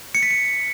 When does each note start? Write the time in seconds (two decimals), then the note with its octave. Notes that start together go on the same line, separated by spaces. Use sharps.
0.15 C#7
0.23 B6
0.31 C#7